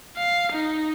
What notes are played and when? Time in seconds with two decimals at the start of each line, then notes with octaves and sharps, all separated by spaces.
0.17 F5
0.52 D#4